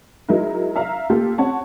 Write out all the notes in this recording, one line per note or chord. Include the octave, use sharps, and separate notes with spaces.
F#3 G#3 D#4 E4 A#4
E5 F5 A#5
A#3 F4 G4 A4
C4 C#5 F#5 A5